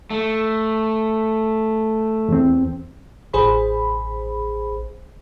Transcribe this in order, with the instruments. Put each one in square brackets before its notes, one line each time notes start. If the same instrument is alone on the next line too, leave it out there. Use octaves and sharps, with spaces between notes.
[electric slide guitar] A3
[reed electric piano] E2 C4
[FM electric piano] A1 G#4 C5 B5